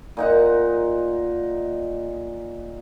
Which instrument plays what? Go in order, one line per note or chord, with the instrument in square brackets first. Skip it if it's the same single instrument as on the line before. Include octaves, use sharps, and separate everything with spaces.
[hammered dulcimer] A#2 D#4 F#5